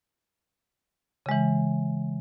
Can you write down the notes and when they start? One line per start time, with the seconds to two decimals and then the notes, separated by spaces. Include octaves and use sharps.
1.26 C#3
1.29 G#3
1.31 E3